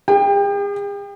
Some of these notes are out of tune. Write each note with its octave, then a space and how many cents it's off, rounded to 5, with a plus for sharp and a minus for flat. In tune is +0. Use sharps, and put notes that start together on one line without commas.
G#4 -45 G5 +25